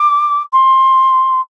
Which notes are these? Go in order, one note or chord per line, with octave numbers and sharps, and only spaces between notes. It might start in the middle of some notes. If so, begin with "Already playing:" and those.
Already playing: D6
C6